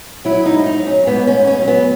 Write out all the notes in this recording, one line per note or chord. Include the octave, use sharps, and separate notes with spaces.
F#3 E4
D#4
G#2
D#4
F#3
C#4
G#2 B3
C#4
G#2
C#4
F#3
B3